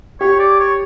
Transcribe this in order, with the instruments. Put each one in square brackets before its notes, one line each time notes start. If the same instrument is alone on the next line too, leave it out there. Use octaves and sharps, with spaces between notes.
[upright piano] G4 [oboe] C#5
[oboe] D5
C#5